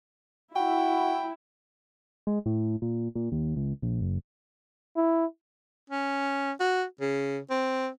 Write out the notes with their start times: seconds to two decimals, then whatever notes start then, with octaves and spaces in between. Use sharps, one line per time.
0.56 E4 F#4 G5
2.27 G#3
2.46 A2
2.82 A#2
3.15 A#2
3.32 D#2
3.56 C#2
3.82 A#1
4.01 F#1
4.96 E4
5.90 C#4
6.60 F#4
7.00 C#3
7.50 C4